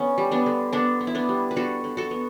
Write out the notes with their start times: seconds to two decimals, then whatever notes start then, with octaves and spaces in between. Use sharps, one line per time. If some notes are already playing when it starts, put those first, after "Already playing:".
Already playing: D3 B3 C#4
0.18 G3
0.32 B3 D4
0.46 D3
0.73 D3 B3 D4
1.01 B3
1.07 E4
1.15 B3 D4
1.29 G3
1.51 B4
1.56 D3 F#4 A4
1.84 D3
1.97 F#4 A4
2.11 B3